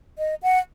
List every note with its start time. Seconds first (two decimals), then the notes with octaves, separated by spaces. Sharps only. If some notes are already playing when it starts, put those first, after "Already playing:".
0.18 D#5
0.43 F#5